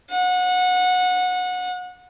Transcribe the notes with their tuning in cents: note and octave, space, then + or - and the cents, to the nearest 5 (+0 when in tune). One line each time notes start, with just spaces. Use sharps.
F#5 -25